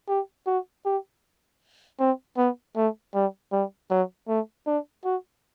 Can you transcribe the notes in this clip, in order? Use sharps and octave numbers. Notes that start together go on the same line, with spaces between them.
G4
F#4
G4
C4
B3
A3
G3
G3
F#3
A3
D4
F#4